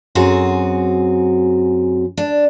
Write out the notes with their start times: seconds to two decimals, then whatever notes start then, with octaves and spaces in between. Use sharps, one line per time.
0.15 F#2 C4 F#4 G#4
2.17 D4